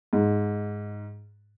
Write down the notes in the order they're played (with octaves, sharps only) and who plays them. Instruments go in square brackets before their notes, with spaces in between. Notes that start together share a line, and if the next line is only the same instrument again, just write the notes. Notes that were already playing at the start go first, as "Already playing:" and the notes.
[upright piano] G#2